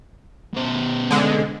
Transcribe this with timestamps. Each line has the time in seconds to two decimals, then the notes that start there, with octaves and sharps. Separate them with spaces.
0.54 B2 C5
1.11 D3 G#3